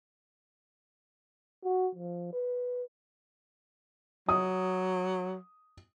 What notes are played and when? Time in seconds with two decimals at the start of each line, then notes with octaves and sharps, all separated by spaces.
1.64 F#4
1.95 F3
2.33 B4
4.29 F#3 D#6